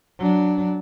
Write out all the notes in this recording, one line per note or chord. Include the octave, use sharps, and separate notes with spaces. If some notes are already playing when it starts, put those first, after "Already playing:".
F#3 D4